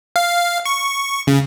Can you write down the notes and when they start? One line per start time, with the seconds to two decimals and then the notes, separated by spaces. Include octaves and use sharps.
0.16 F5
0.65 C#6
1.27 C#3